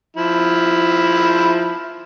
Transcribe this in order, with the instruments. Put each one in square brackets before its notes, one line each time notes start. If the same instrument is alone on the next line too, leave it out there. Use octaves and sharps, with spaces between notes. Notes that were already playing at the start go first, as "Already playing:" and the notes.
[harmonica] F3 E4